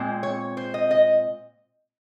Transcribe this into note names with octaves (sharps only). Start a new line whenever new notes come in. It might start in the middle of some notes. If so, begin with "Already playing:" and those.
Already playing: A#2 G#3 C4
C#5
C5
D#5
D#5